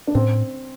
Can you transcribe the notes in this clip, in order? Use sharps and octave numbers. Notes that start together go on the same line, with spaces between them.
D4
A2 C4